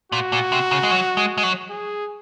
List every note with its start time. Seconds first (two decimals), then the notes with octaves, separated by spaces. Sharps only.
0.12 A#2 F#4
0.32 A#2
0.52 C3
0.71 C#3
0.83 G#3
0.91 F#3
1.17 G#3
1.38 G#3
1.43 F#3
1.70 G#4